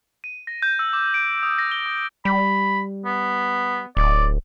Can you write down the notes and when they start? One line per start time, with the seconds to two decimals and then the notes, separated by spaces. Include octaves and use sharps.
0.24 D#7
0.47 A#6
0.62 G6
0.79 E6
0.93 D6
1.14 D7
1.43 D#6
1.58 A#6
1.71 G7
1.86 D#6
2.25 G3 B5
3.05 B3
3.97 D1 D5